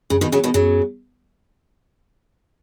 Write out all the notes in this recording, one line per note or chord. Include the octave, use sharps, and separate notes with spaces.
F#2 C#3
B2 D#3
C#3 F#3
B2 D#3
F#2 C#3 F#3